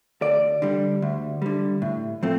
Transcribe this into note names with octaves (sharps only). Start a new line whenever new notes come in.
D2 D5
D3 G3
D2
D3 G3
A2
F3 A3 C4